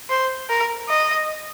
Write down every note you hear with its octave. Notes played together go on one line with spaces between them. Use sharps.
C5
A#4
D#5